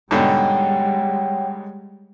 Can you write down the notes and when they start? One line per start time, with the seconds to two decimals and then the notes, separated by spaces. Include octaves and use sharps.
0.11 G#2 B2 D3 G3 G#3 C#5 F#5 G5